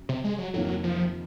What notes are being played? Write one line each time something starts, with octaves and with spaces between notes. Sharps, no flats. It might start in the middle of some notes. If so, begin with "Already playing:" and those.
Already playing: F#2
C3
G#3
F#3
F2 C3 D#3 F#3 A#3
F3